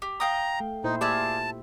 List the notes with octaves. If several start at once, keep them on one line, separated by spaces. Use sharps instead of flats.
G4
F5 G5 A#5 D#6
A3
A#2 D#4 E4 C5
F4 G4 G#4 D5 E5 A5